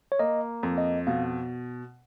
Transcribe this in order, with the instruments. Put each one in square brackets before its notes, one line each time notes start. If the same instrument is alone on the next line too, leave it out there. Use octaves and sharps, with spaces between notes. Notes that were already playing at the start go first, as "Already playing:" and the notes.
[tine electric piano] C#5
[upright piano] A#3 [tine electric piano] D#5
[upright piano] F2
[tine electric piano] D#5
[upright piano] B2 [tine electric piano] F5